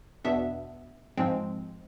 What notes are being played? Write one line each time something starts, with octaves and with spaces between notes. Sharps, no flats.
E2 B2 B3 D4 E5
G#2 F3 G#3 C4